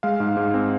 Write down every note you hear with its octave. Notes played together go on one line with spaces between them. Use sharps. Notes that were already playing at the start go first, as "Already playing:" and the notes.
G#3 F5
G#2
G#2
C4